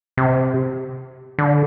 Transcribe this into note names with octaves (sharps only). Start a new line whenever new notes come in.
C3
D3